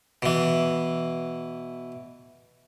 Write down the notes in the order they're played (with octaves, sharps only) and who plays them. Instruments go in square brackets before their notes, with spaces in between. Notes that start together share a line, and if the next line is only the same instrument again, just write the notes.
[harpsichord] B2 E3